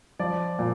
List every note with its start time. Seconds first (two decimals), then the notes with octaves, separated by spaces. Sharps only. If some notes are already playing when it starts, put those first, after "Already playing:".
0.20 F3 D5
0.59 A#2